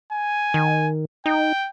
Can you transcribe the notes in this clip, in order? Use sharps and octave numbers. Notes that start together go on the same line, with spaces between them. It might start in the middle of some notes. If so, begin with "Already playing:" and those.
G#5
D#3
D#4 G5